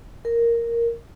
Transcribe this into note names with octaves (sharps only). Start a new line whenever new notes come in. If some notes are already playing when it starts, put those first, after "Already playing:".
A#4